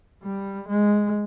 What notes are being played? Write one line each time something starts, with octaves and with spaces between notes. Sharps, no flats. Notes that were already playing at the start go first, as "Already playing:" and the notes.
G3
G#3